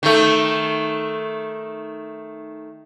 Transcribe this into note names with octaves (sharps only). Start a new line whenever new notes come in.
D#3 A3